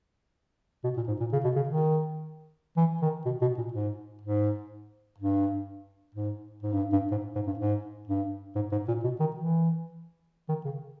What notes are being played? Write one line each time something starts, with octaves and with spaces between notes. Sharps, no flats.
B2
A#2
G#2
A#2
C#3
B2
C#3
D#3
E3
D#3
B2
B2
A#2
G#2
G#2
G2
G#2
G#2
G2
G2
G#2
G#2
G2
G#2
G2
G#2
G#2
A#2
B2
D#3
E3
D#3
C#3